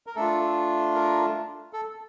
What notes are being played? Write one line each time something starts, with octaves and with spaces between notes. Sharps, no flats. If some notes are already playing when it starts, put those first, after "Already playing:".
A#4
A3 D4 F4 A4
A#4
A4